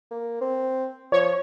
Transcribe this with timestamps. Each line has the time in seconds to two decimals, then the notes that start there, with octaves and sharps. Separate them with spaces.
0.11 A#3
0.41 C4
1.12 F3 C#5